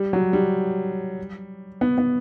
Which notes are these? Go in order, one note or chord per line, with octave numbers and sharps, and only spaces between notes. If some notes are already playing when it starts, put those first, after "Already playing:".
Already playing: G3
F#3
G3
B3
B3